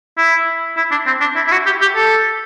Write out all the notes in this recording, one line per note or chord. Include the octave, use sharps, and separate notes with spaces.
E4
E4
D4
C4
D4
E4
E4
F#4
G4
G4
A4